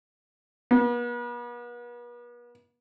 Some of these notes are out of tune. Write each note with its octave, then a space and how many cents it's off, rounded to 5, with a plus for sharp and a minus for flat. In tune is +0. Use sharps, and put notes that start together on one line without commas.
B3 -40